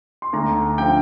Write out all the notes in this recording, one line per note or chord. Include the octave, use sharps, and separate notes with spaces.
C6
D2 A#5
D3 F3 G5